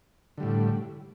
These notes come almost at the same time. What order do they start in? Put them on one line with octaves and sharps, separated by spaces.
D3 G3 A2